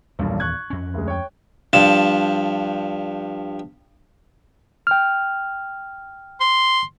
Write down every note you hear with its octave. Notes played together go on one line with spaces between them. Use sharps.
D#1 B1 E2 G2 A#2
C#6 F#6 G#6
F2 C#4
D2 G#3
C#5 G5
G2 F3 A5
G5 F6
C6